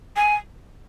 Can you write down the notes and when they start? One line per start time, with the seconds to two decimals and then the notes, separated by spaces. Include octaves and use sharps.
0.16 G#5